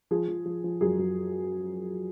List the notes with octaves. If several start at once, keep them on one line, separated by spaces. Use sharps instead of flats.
F3 G#4
F3
F3
F3
F#2 G#4
F#2